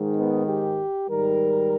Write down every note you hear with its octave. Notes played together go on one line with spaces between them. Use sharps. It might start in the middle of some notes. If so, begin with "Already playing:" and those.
Already playing: G#2 D#3 G#3
B3
G4
G#2 D#3 G3 A#4